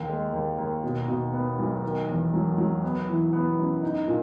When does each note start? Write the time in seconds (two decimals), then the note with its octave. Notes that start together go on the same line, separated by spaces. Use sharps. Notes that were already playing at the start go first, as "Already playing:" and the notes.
Already playing: D#2
0.09 G#3
0.33 D#2
0.58 D#2
0.83 B2
1.08 B2
1.33 B3
1.59 B1
1.83 D#3
2.08 E2
2.34 F#3
2.58 F#3
2.83 B3
3.08 E3
3.33 B3
3.58 F#2
3.83 D#4
4.08 A#2